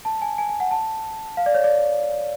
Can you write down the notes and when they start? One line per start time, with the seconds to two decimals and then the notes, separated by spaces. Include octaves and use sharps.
0.05 A5
0.22 G#5
0.38 G#5
0.49 G#5
0.60 F#5
0.71 A5
1.37 F5
1.46 D5
1.54 C#5
1.64 D5